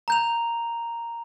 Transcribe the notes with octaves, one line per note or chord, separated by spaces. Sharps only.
A#5 G6 F7